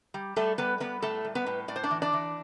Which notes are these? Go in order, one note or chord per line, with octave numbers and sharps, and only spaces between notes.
G3
G3 A3 A4
G3 B3 B4
G3 B3 B4
A2 A3 A4
G3
B3 B4
A2
A2 D5
C5
D4 D5
E3
D4 D5
E3